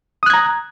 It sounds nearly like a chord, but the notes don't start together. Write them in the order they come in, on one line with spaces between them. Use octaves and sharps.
D#6 F#6 G#6 A#5